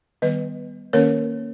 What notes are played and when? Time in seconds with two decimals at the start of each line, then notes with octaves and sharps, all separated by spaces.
0.22 D#3 G3 B3 B4 D#5
0.93 D#3 A#3 C#4 A#4 C#5